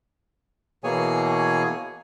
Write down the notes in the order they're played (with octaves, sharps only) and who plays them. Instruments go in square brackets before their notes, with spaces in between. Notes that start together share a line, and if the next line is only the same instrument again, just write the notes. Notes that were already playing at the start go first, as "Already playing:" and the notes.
[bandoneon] B2 E3 A#3 G#4 C#5 G#5